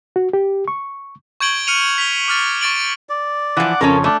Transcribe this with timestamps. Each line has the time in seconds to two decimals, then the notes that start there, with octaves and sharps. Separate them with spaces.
0.16 F#4
0.33 G4
0.68 C#6
1.40 C#6 G6 G#6 D7 F#7 G7
1.67 F6 C#7 D#7 F7
1.98 B6 F7 G7
2.28 D6 F6 A6
2.61 C#6 A6 D7 F#7
3.09 D5
3.57 E3 F3 F#5 D6
3.81 F2 C#3 C#4 A4 A#4
4.04 A3 D4 D5